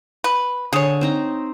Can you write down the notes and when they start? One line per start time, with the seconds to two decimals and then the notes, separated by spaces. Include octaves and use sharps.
0.24 B4
0.73 D3 G#4 C#5
1.01 C4 D#4 A#5